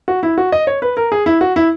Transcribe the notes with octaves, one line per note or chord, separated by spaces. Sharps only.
F#4
E4
F#4
D#5
C#5
B4
A#4
G#4
E4
F#4
E4